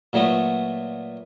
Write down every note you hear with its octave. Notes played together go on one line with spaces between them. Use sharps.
A#2 F#3 A3 B3 F#4